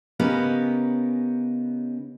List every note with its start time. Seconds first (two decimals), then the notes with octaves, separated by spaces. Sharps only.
0.20 C#3 B3 C#4 D#4 G4 A#4